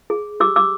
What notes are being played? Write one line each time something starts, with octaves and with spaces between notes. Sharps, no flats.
G#4
G4 D6 E6
D6 E6